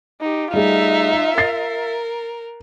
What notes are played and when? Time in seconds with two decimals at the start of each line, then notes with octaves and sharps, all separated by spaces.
0.21 D#4 G4
0.54 G3 A3 D#4 F4 G#4 E5
1.38 A#4 A6 C7